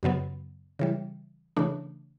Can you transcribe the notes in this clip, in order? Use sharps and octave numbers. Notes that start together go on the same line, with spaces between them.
F#2 C#3 F#3 B3
C#3 E3 G3
C#3 E3 A3 D4